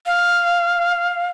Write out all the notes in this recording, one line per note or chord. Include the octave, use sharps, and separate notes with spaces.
F5